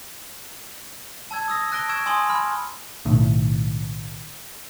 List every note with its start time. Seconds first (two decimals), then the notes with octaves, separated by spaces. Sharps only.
1.31 A5 E6 G#6
1.48 D#6 E6 A#6
1.72 A5 F#6 A#6 D7 G7
1.89 C#6 E6 G#6 D7 E7
2.06 G#5 C6 D#6 F#7 G7
2.29 B5 F6
3.05 B1 A2 D#3